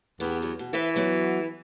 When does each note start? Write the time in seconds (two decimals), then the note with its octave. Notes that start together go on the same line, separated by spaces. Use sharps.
0.20 E2 B3 G4
0.42 F#3
0.59 B2
0.73 E3 B4 C5 E5
0.96 F#3 B3 F#4